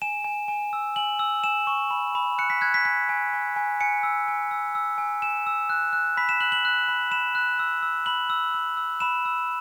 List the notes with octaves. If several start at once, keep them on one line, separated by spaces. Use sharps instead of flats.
G#5 E7
G#5
G#5
E6
G#5 F#7
E6
G#5 E7
C#6
B5
B5
F#6 C#7
B6
F#6 G#6
B6
G#5 B6
G#5
G#5
G#5
G#5 C#7
E6
G#5
E6
E6
G#5
G#5 E7
E6
F#6
F#6
B5 B6
E7
F#6 F#7
F#7
F#6
B5
B5 E7
F#6
E6
E6
B5 F#7
E6
E6
E6
B5 E7
E6